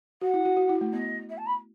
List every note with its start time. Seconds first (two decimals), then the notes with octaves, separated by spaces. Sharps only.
0.21 F#4 F#5
0.34 E4
0.45 F#4
0.57 F#4
0.69 E4
0.81 A3
0.92 B3 D#5
1.29 E5
1.37 A5
1.46 B5